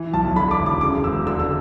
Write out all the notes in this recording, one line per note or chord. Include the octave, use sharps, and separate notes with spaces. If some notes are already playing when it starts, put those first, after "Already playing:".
Already playing: E3
B1 A5
D3 B5
D6
E1
D6
C#3 D6
E1 E6
D3 E6
E6